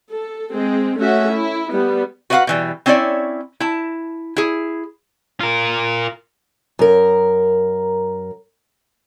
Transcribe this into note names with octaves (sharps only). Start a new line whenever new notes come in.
A4
G#3 C4
A3 C#4 F#4 E5
E4
G3 B3
F#4 B4 D5 D#5 F5 F#5
B2 E3 G3
C4 C#4 E4 C#5 D5
E4 A5
E4 G#4
F4 A#4
F#2 A#4